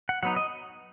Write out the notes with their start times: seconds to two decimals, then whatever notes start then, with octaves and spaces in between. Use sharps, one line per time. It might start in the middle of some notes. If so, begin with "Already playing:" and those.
0.09 F#5
0.23 F#3 B3 D#4 F#5
0.36 D#5